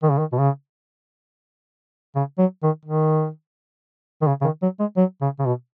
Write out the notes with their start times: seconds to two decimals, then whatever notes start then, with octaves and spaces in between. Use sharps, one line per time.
0.02 D#3
0.11 C#3
0.18 D#3
0.32 B2
0.38 C#3
2.15 C#3
2.38 F#3
2.63 D#3
2.85 D#3
4.21 D#3
4.27 C#3
4.41 C#3
4.44 D#3
4.63 F#3
4.80 G#3
4.97 F#3
5.21 C#3
5.39 C#3
5.45 B2